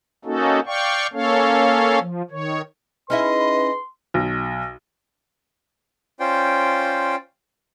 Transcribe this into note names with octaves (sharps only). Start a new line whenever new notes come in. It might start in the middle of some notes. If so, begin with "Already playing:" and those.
A#3 C#4 D#4 F#4 A4
D5 F5 G5 C#6
A#3 C#4 A4 C#5 F5
F3
D#3 C#5
C#4 D#4 E4 G#4 B4 D#5 E5 C6
B1
C#4 F4 C5 D5 G5